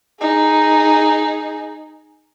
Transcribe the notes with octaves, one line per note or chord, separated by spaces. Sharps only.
D#4 G#4